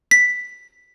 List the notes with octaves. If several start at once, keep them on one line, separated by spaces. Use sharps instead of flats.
B6